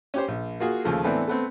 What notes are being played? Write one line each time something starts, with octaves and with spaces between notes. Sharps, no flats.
C#4 G4 C5
A#1
A#3 F4 F#4 G#4
D#2 C#3 F3 A3
A2 E3 A3 B3 C4 D4
A3 B3 C4